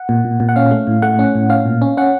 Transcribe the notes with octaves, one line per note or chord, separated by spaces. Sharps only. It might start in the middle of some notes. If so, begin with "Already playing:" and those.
Already playing: F#5
A#2
A#2
A#2
F#5
C#4 F5
A3
A2
A3 F#5
C#4
A2
C#4 F5
A#2
C#4
C#4 F#5